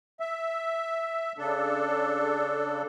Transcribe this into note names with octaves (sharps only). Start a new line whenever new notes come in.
E5
C#3 D4 A4